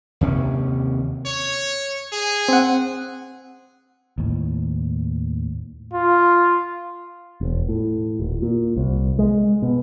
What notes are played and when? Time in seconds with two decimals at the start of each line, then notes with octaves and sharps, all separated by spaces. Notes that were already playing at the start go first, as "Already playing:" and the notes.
0.21 D#2 C3 C#4
1.26 C#5
2.12 G#4
2.48 C4 F#5
4.18 D#2 A2
5.93 F4
7.41 E1
7.68 A2
8.20 D#1
8.42 A#2
8.76 C2
9.19 G#3
9.62 B2